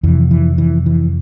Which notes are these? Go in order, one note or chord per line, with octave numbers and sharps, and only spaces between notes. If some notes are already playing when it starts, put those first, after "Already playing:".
F2 C3 E3
E3
E3
E3